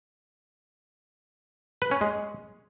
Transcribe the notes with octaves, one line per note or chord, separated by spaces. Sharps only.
B4
C#4
G#3